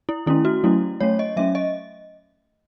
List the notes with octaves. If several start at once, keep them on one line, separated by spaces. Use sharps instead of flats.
E4
D#3 A3 C#4 E4
F#4
F#3 A3 C#4 E4
F#3 A3 C#4 C#5
D#5
F#3 A3 C#4 E5
D#5